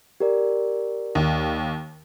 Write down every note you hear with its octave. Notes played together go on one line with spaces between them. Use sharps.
G4 A#4 D5
D#2